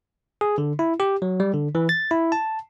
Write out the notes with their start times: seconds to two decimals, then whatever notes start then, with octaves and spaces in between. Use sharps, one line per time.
0.41 G#4
0.58 D3
0.79 E4
1.00 G4
1.22 F#3
1.40 G3
1.54 D3
1.75 E3
1.89 A6
2.11 E4
2.32 A5